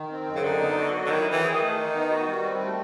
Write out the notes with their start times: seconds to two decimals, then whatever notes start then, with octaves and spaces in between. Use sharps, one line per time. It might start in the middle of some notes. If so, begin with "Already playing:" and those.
Already playing: D#3
0.11 C4
0.28 F#2
0.36 C#3
0.44 D3 D#4
0.60 B3
0.77 F#4
0.94 F#3
1.06 D3
1.10 D#3 E4
1.27 E3 C4
1.43 G#4
1.55 D#3
1.61 A3
1.77 D#4
1.95 B3
2.11 F#4
2.27 G3
2.44 C4
2.60 A3